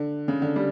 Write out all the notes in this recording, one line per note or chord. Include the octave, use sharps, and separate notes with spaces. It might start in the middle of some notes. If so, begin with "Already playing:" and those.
Already playing: D3
C#3
D3
G3